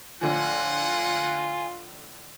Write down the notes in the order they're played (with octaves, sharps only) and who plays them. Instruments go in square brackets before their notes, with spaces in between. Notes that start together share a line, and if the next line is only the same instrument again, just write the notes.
[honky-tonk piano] A2 D3 F3 [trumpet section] A#3 F#5 [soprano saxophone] F4 [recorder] G#5